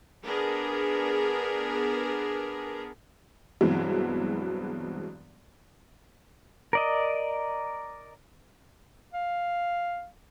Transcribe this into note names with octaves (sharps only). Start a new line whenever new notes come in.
B3 D4 G#4 A#4
G2 B2 E3 F#3 G#3 C4
A#4 D5 D#5
F5